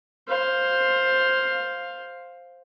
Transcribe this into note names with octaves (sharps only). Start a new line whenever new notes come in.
C5 F5